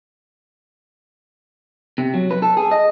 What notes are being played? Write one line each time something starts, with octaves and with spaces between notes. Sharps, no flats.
C3
F#3
B4
A4
G#4
D#5